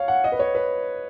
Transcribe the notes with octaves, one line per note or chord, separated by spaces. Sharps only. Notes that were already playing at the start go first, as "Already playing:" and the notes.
Already playing: C#5 F5
F#5
D#5
B4
C#5
B4